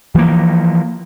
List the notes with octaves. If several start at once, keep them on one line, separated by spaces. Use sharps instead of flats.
E3 F3 G#3 A#3